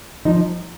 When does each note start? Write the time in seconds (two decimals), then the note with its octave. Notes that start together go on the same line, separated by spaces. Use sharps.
0.25 F3 D#4